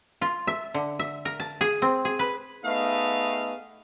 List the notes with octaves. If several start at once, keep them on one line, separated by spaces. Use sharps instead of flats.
F4
E5
D3
E5
A#4
A5
G#4
C4
G#4
B4
A3 B3 D#4 G#4 D#5 F5